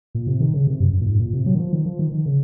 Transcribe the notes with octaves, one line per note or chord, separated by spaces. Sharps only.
A#2
C3
D#3
C#3
C3
F#2
F#2
A#2
G#2
A#2
C3
F#3
D#3
F3
D#3
F3
D#3
D#3
C#3